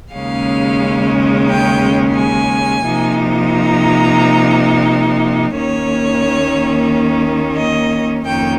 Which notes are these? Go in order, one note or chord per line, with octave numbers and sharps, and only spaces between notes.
D#2 C#3 G#3 C#4 F5
G5
G#5
C3 F3 A#3 D#4
A#5
D#2 D#3 A#3 C#4 C#5
D#5
F2 D#3 A#3 C#4 G5